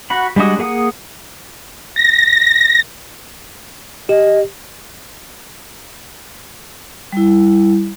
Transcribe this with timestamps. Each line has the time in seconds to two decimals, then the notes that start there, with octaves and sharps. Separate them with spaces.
0.10 F#4 F#5 B5
0.36 G3 G#3 D4 F#4 D#6
0.59 A#3 G#4 F#5 D#6
1.96 A#6
4.09 G4 D#5
7.12 G3 E4